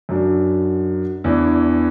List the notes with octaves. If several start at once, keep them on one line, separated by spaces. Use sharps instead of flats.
F#2 F#3 D4
E2 E3 D4